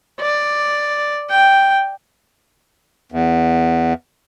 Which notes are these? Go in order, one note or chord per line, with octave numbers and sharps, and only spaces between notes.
D5
G5
E2